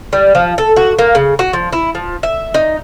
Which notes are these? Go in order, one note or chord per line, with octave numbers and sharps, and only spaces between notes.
G3
F3
A4
F#4
A#3
C#3
F#4
F3
E4
F3
E5
D#4